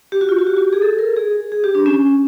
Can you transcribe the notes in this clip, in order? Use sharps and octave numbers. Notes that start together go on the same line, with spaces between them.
G4
F#4
F4
F#4
G4
F#4
G4
G#4
A4
A#4
G#4
G#4
G4
D4
C#4